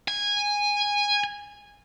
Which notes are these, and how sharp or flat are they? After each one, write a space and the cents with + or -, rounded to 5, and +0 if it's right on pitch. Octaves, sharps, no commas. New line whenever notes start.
G#5 -15